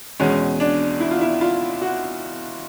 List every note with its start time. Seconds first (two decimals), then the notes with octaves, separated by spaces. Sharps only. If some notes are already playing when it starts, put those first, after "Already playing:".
0.20 E2 B2 G#3 C#4
0.60 D4
1.00 E4
1.11 F4
1.21 E4
1.41 F4
1.82 F#4